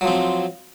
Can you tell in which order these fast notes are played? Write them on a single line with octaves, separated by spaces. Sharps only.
F#3 F3 C4